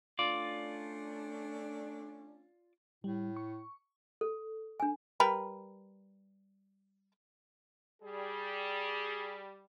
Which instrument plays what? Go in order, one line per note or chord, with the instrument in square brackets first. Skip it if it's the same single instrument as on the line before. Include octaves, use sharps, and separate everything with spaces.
[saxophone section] A3 C#4 D4 [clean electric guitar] F4 D5
[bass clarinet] A2 [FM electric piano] G3
[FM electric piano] C#6
[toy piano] A4
D4 G#5
[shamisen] G3 A#4 B4
[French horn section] G3 [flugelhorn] G#4